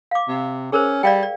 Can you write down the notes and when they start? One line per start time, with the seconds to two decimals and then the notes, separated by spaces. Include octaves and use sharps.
0.11 F5 D6
0.28 C3
0.72 C#4 G#4 A#4 C5
1.03 G3 D5 F5 G5
1.23 D5